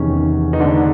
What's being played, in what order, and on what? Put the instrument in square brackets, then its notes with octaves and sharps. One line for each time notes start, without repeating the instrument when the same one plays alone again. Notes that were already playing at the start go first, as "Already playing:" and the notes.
Already playing: [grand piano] E2 C3 D#3 [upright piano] C#4
[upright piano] D#4
D3 D4